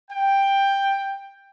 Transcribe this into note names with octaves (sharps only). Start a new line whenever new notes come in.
G5